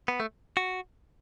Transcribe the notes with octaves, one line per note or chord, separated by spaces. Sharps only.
B3
A3
F#4